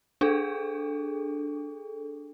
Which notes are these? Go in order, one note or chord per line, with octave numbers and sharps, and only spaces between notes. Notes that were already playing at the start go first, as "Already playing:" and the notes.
D4 G#4 A4